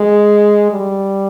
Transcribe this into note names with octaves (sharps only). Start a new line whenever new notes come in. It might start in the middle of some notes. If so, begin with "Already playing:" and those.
Already playing: G#3
G3